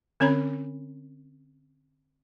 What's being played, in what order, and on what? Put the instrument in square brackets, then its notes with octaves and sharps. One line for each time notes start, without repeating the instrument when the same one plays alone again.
[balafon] D3 C4 C#4 C#5 A#5 B5